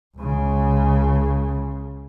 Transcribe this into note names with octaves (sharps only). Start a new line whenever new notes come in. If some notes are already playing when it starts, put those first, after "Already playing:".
C#2 C#3